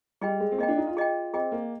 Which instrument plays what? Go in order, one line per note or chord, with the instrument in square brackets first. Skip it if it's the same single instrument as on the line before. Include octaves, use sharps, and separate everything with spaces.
[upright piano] G3 [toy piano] G#4 D#5 G5
[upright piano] G#3
C4
[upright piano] A#3 [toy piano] G#4 D#5 G5
[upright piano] D4
D#4
F4
[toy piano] G#4 D#5 G5
[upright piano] C4 [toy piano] G#4 D#5 G5
[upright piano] A#3